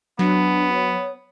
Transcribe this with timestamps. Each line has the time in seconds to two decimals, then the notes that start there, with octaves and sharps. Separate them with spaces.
0.19 F#3 B3 D4
0.73 C#5